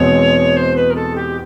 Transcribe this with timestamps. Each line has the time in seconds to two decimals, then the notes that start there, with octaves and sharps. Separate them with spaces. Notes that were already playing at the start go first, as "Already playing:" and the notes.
Already playing: E2 B2 G#3 C4 C#5
0.57 C5
0.76 B4
0.90 A#4
0.95 A4
1.16 G4